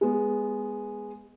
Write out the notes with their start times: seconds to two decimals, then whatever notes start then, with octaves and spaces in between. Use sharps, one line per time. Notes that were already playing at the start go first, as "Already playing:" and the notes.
0.01 G#3 B3